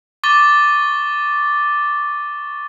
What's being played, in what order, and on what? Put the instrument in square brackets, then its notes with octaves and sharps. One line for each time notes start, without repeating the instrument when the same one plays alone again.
[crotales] C#6 D6 A6 G7